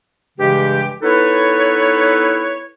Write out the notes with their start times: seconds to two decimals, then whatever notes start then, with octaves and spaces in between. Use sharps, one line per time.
0.38 G2 C#3 E3 G#3 G4
1.03 B3 D#4 E4 A4 B4 C#5